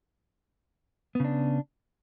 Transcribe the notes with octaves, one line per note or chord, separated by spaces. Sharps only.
C#3 B3 D4